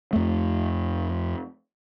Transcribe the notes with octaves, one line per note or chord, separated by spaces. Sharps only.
F2 A3